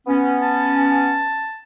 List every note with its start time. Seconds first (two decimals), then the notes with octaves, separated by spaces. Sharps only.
0.07 B3 C#4
0.42 A5